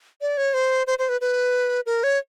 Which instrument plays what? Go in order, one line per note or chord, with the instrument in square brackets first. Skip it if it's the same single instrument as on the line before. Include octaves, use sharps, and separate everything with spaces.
[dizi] D5
C#5
C5
C5
C5
B4
B4
A#4
C#5